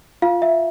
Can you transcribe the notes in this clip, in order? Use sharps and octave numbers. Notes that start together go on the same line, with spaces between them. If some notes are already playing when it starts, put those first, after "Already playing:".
F4 F5
E5